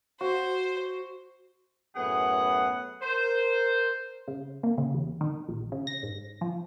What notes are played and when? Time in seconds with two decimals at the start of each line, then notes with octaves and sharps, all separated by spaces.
0.21 F#4 C5
1.96 F#2 A2 B3 G#4 F#5
3.02 A#4 C5
4.28 C#3
4.63 A#3
4.78 C#3
4.94 E2
5.21 D#3
5.48 A#1
5.72 C#3
5.87 A#6
6.03 G#2
6.41 F3